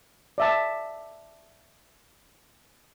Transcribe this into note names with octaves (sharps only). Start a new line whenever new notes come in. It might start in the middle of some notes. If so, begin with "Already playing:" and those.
D5 E5 A5